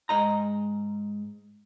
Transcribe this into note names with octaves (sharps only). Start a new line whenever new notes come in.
G#2 D#5 A#5